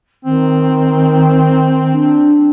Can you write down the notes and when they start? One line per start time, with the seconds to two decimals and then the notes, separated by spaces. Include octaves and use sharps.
0.25 D#3 C4
1.92 D4